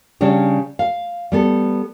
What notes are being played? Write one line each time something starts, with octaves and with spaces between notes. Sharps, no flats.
C#3 G3 C#4 D4 G4
F5
G3 B3 A4